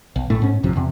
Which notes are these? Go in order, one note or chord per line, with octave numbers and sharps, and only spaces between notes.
B1
A#1 A2 A3
G#2 C#4
A1 F#2 C3 F3
E2 C3